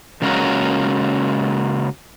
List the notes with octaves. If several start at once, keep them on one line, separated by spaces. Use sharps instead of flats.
C#3 G#3 A#3 C#4 F#4 A#4